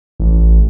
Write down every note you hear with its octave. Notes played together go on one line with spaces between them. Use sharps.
A1